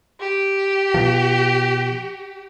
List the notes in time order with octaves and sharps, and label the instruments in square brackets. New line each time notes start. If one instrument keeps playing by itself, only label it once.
[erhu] G4
[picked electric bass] B2 F3